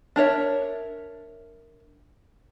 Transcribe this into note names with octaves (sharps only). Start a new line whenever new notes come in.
D4 A#4 C#5 E5